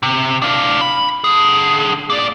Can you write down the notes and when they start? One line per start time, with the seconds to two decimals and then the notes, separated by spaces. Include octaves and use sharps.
0.03 C3
0.42 D4 F4
0.81 B5
1.24 D3 G#4
2.10 A#3 D5